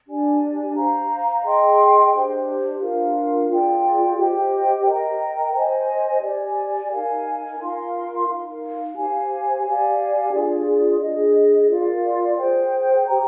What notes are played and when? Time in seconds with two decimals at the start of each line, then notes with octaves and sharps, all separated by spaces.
0.07 D4 G4 D5 G#5
0.75 C5 F5 A#5
1.44 G#4 D#5 G5 C6
2.12 D4 G4 C5
2.80 D4 F4 A#4 F5
3.49 F4 G#4 D5 G5
4.17 G4 C5 D#5 G5
4.86 A#4 D#5 G5 A#5
5.54 C5 D#5 G#5
6.22 G4 D5 G#5
6.90 D#4 A#4 F5 G#5
7.59 F4 A#4 F5 C6
8.27 D#4 A#4 F5
8.96 G4 C5 F5 G#5
9.64 G4 D5 F5 G#5
10.32 D4 F4 G#4 D5
11.01 D4 G#4 D#5
11.69 F4 A#4 D5 F5
12.37 G#4 C5 G5
13.06 G4 C5 G5 A#5